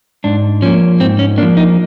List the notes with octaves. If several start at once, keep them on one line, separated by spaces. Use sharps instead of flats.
G#2 D4
F3 A#3 C#4
G#2 C4
C#4
F3 A#3 D4
D#4